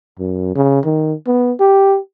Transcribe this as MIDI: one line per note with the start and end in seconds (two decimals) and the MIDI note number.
0.19 0.51 42
0.55 0.80 49
0.85 1.13 51
1.27 1.52 59
1.60 1.98 67